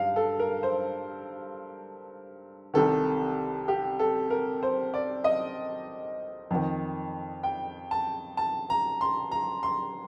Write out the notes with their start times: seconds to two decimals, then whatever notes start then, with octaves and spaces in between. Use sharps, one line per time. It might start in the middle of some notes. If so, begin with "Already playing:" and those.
Already playing: G2 F5
0.16 A4
0.39 A#4
0.63 C5
2.74 C2 C3 D#3 A4
3.68 G4
3.99 A4
4.30 A#4
4.63 C5
4.94 D5
5.24 D#5
6.50 F2 D#3
7.43 G5
7.91 A5
8.37 A5
8.70 A#5
9.01 C6
9.31 A#5
9.63 C6